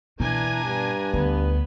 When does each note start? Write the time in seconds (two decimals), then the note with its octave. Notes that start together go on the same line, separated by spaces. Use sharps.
0.20 B2 E3 D4 G#5 A#5
0.64 G2
1.14 D2 B3